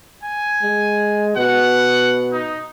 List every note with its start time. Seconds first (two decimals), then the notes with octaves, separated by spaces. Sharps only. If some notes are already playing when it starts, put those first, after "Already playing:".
0.24 G#5
0.62 G#3
1.37 B2 F#5
2.32 D#4